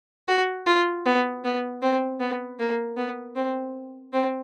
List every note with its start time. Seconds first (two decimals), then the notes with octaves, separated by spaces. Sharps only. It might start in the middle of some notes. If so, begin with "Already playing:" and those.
0.28 F#4
0.66 F4
1.06 B3
1.44 B3
1.82 C4
2.20 B3
2.59 A#3
2.97 B3
3.35 C4
4.13 C4